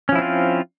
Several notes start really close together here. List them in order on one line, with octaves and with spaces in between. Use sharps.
C#4 F3 E4 C4 F4